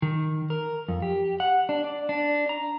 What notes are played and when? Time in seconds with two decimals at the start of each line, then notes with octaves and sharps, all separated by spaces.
0.02 D#3
0.50 A#4
0.88 F2
1.02 G4
1.40 F#5
1.69 D4
1.84 D5
2.09 D4
2.49 A#5